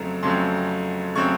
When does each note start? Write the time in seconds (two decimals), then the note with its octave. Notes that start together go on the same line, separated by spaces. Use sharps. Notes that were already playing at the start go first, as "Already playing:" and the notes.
Already playing: F2 C#3 F#3 A3 C4 A#5
0.23 F2 C#3 F#3 A3 C4 C6
1.15 C#3 F#3 A3 C4 C#6